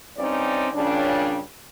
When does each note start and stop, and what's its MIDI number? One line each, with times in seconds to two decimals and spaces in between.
0.17 0.68 43
0.17 0.68 60
0.17 0.68 61
0.17 0.68 63
0.17 0.68 74
0.74 1.38 46
0.74 1.38 49
0.74 1.38 55
0.74 1.38 61
0.74 1.38 62